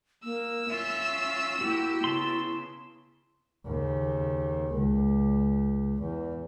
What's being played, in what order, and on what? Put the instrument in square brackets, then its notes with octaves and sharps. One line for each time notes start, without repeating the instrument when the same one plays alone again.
[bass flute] A#3 [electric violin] E6
[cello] C#4 F4 [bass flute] E5
[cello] A#3 G4 [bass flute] E4 [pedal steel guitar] F#4
[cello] C#3 B3 [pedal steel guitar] A5 C6
[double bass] D#2 C#3
C#2
E2